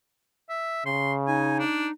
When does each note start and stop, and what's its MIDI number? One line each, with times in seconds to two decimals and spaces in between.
0.50 0.86 76
0.86 1.62 49
0.86 1.13 84
1.27 1.91 63
1.27 1.59 80
1.59 1.87 62